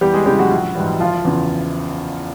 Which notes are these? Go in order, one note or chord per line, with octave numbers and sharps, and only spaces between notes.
E2 G3 G4
G#3 G#4
C#3 E3 G3 G4
F#3 F#4
A#1
G#2 E3 G3
F#1 F3 F4
E2 C#3